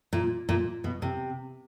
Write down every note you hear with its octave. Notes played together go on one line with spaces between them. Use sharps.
A#2
A#2
B2
C3